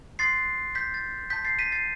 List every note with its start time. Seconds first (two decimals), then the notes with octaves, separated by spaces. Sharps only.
0.19 C6 D#6 F#6 A6 C7
0.75 G6 B6
0.94 A6
1.30 A5 C6 D#6 G6 B6
1.45 A6 C7
1.59 B6 D#7
1.72 A6 C7